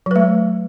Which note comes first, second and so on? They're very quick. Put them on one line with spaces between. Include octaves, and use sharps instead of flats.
F#3 B4 A3